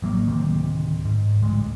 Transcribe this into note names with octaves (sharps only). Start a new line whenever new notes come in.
A1 F#3 A#3
D1 D2 C3 D#3
G#2
A1 D2 G#3